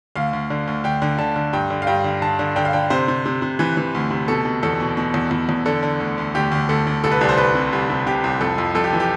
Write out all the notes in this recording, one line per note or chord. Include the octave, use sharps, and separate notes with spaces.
D2 F5
D2
D3
D2
D2 G5
D3
D3 A5
D3
G2 G5
D3
F5
G2 G5
D3
D3 A5
D3
D3 G5
F5
D3 G5
C3 C5
C3
C3
C3
E3 B4
E3
D2
C3
B2 A4
B2
E2 A4
B2
B2
E2
E2
E2
D3 A4
D3
D2
D2
D2 G4
D2
D2 A4
D2
C2 A4
B4
C2 D5
C5
C2 B4
C3
C2
C3
C3 G4
C2
F2 A4
F2
F2 A4
G4
E3
G4